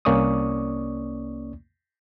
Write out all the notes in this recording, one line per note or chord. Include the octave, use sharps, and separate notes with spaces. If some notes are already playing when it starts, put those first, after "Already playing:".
C2 A#3 C#4 D5 C#6 D#6